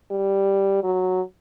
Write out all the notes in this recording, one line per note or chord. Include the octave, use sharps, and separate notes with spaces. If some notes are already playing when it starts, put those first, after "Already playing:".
G3
F#3